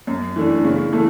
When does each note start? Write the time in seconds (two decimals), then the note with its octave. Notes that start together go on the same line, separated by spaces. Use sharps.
0.07 F#2
0.36 E3 A3 D4
0.64 C#3
0.92 E3 A3